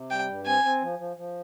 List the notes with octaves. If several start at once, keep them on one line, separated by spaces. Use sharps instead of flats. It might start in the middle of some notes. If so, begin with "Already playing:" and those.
Already playing: C3
G3 G5
G2
C4 G#5
C4
F3
F3
F3